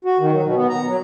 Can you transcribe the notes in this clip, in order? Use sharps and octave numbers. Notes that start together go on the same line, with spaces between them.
F#4
D#3
F#3
B2
B3
A#5
F#3